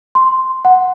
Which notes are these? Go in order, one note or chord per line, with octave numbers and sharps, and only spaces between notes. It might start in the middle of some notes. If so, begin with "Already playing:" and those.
C6
F#5